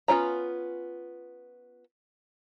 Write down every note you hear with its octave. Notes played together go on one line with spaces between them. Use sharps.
B3 C#4 F4 C#5 A#5